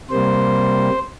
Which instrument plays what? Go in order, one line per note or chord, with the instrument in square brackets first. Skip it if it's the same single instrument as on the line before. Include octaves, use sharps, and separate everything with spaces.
[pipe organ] C3 G3 A#3 C5